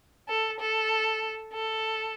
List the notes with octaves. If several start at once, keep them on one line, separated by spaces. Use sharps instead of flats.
A4
A4
A4